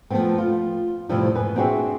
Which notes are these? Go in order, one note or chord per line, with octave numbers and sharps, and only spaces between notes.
F3 F#3 A3 B3 C4
F4
F2 A2 C3 E3 F3 G3
G#2 B4 G#5
C4 D4 F#4 G#4 E5 G5